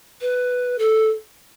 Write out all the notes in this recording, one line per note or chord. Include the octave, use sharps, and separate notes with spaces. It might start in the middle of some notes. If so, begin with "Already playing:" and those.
B4
A4